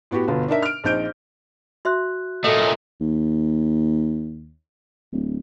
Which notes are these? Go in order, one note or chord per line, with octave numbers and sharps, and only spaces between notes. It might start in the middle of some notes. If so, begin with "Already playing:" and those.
A2 B3 F#4 G4
G1 B2 F4
D4 D#4 A#4 E5
F6 D7
A#1 C4 D#4 G6 D7
F#4 E5 C6 F#6
A#2 A3 A4 D#5 F#5
D#2
D1